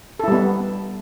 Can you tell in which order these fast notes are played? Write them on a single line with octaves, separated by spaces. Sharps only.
A4 E4 G3 B3